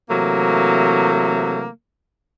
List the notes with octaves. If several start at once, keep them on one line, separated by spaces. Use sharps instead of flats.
C3 E3 F#3 A3 A#3